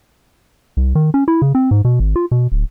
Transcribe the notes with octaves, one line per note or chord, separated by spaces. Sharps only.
C2
D#3
C#4
E4
C#3
C4
G#2
B2
G#1
F4
B2
D1